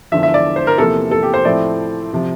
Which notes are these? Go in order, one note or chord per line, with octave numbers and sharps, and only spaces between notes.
E2 D3 F3 E5
E5
D5
C5
A#4
E2 C3 F3 A#3 A4
A4
G4
C5
A2 F3 A3 C4 D5
C3 F3